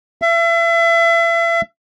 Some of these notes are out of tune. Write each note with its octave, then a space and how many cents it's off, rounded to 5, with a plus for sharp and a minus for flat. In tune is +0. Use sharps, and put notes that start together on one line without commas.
E5 +35